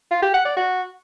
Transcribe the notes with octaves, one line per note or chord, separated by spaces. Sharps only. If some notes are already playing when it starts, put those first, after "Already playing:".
F4
G4
F#5
D5
F#4